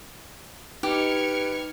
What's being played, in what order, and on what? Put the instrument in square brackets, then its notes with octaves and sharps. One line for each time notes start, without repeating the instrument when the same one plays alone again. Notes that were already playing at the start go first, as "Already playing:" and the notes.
[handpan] D#4 [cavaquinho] G4 [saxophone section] B4 [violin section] F6 G#6 C#7